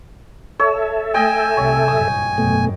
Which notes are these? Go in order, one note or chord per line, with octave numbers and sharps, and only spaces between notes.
A4 C#5 E5
A3 D#5 G5 G#5
C2 C3 C#5
F#1 G2 A#2 D#6
G#1 F#2 B2 A3